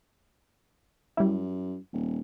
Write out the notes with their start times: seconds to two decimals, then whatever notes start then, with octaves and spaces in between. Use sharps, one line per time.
1.17 F#2 G3 E4
1.93 D#1